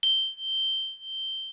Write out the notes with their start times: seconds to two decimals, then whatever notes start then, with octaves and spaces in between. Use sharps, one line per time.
0.03 G7